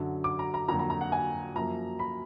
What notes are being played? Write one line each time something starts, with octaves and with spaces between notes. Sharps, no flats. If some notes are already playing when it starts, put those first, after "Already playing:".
Already playing: F#2 D3 F#3
D6
A#5
A#5
F2 D3 F#3 A#3 A#5
A#5
A#5
F#5
G#5
F#2 F3 A#3 A#5
B5